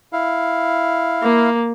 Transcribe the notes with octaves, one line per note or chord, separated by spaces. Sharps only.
E4 F5
A#3